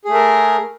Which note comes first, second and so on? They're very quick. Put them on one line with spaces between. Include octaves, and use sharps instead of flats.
G#4 A3 A#4